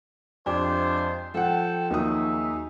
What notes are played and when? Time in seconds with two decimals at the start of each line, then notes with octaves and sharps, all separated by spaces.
0.46 F2 G#3 D4 F4 G4 C5
1.34 F3 A4 F#5 G5
1.91 D#2 F#3 D#4 G#4 E5 D#6